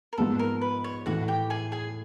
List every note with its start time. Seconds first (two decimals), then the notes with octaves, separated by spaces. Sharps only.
0.13 A#4
0.18 G#2 F3 G#3 B3 A4
0.39 A#4
0.61 B4
0.84 C#5
1.06 A2 E3 A3 F#4 F#5
1.28 G4 G5
1.50 G#4 G#5
1.72 G#4 G#5